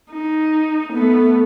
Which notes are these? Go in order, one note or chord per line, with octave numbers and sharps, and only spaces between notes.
D#4
A3 B3